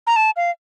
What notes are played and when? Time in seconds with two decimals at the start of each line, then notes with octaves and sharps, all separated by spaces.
0.07 A#5
0.16 A5
0.36 F5